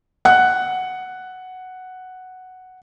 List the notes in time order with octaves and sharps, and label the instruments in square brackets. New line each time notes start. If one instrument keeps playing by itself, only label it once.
[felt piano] F#5 F#6